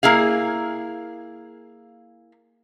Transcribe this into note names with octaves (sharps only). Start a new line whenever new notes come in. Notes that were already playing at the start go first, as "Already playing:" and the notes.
A#3 E4 G#4 F5